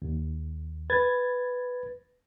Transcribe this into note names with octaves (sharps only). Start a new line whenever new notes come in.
D#2
B4 G#6 A6